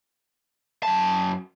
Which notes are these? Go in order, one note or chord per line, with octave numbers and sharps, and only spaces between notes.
F#2 A5